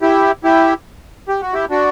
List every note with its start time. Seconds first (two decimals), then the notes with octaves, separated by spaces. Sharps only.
0.02 E4 G4
0.44 E4 G4
1.29 G4
1.42 F#4
1.54 E4 G4
1.70 D4 F#4